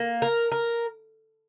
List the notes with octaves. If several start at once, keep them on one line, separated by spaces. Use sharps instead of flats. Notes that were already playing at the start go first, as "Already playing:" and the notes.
Already playing: A#3
A#4
A#4